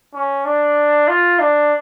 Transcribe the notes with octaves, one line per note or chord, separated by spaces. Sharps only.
C#4
D4
F4
D4